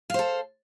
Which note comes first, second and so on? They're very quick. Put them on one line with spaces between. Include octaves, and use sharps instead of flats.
F5 C5 A4